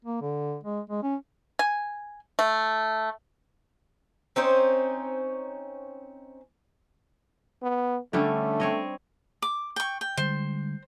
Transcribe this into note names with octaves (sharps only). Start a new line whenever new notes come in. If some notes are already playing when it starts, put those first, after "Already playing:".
A#3
D3
G#3
G#3
C#4
G#5
A3
C4 C#4 D#4 C5
B3
D3 G3 A3 C#4
C4 C#5 D#5
D6
G5 C#6
G5
D3 G3 G#3 C5